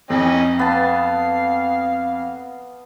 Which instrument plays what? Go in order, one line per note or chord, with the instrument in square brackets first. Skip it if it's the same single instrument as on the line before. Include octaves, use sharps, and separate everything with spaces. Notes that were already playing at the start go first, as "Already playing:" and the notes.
[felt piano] F2 [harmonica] E3 C#4 D#4
[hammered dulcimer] B3 A5 [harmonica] F5